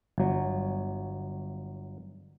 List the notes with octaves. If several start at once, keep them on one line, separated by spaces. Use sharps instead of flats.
G1 F#3